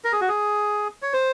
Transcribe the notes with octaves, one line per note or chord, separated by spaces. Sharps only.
A#4
G#4
F#4
G#4
C#5
C5